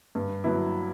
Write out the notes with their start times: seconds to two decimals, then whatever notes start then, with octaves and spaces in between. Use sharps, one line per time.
0.15 G2
0.44 F#3 B3 E4